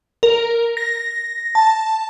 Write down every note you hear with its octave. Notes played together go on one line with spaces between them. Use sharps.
A#4
A#6
A5